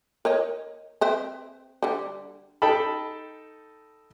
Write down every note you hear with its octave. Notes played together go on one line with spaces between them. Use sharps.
A#4 C#5 D#5
C4 B4 E5
D3 G3
D#4 A4 G5 A5 B5